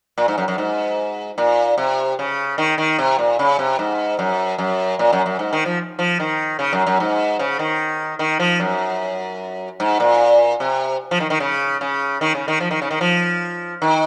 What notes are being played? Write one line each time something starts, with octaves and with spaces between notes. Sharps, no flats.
A#2
G#2
F#2
F#2
G#2
A#2
C3
C#3
D#3
D#3
C3
A#2
C#3
C3
G#2
F#2
F#2
A#2
F#2
F#2
G#2
D#3
F3
F3
D#3
C#3
F#2
F#2
G#2
C#3
D#3
D#3
F3
F#2
G#2
A#2
C3
F3
D#3
D#3
C#3
C#3
D#3
C#3
D#3
F3
D#3
C#3
D#3
F3
D#3